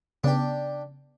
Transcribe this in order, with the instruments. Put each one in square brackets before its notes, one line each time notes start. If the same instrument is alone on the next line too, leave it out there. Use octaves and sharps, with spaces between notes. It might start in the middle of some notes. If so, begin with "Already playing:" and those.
[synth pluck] C#3 B3 [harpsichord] D4 G4